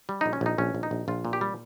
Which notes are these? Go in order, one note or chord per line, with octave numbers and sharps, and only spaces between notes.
G3
A#1 D#4
C#4
A#1 D#4
A#1 C#4
A#1
D#4
A#1
A#1 F4
A#2
G4
G3